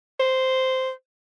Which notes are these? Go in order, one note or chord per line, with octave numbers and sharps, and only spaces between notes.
C5